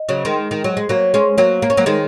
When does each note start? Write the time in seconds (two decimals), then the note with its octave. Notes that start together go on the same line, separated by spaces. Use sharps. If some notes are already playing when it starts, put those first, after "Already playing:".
Already playing: D#5
0.09 C#3 F#3
0.25 D#3 G#3
0.51 D#3
0.64 F#3
0.77 G#3
0.89 F#3 A#3 C#5
1.14 G#3 C#4
1.38 F#3 A#3 C#5
1.62 A#3
1.70 C#4
1.77 F#3 A#3
1.86 D#3 G#3